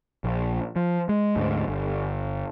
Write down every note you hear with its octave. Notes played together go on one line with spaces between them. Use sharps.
A#1
F3
G#3
D2 G#2 G#3
G1